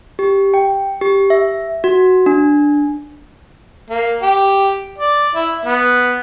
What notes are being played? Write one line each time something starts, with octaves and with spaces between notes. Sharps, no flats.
G4
G5
G4
E5
F#4
D4
A#3
G4
D5
E4
B3